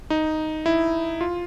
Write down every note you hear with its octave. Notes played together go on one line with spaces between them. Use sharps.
D#4
E4
F4